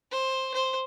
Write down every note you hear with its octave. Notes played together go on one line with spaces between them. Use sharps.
C5
C5